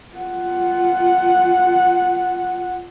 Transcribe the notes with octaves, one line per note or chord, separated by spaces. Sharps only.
F4 F#5